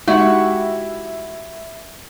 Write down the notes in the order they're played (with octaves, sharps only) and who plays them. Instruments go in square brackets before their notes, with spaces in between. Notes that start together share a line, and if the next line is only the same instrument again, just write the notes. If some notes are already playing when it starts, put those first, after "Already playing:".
[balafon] G#3 D#4 [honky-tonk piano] E4 [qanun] F#4 G4 F#5